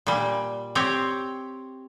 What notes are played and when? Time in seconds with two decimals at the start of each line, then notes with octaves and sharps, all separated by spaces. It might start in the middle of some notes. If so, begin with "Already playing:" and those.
0.07 A#2 G3
0.75 C4 G4 C#5